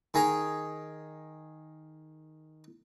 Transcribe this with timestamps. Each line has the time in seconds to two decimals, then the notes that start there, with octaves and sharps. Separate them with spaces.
0.14 D#3 G#4 G#5 A#5